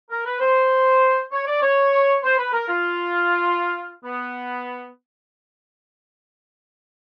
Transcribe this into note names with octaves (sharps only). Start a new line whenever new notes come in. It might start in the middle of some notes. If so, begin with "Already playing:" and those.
A#4
B4
C5
C#5
D5
C#5
C5
B4
A#4
F4
B3